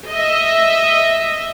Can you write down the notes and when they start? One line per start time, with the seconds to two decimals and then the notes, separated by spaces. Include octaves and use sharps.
0.10 D#5 E5